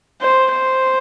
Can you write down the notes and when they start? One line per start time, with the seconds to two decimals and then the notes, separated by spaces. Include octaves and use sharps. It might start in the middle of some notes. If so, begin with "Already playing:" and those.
0.21 C5
0.53 C5